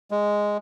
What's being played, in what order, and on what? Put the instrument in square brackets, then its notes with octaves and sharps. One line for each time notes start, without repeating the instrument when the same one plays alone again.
[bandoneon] G#3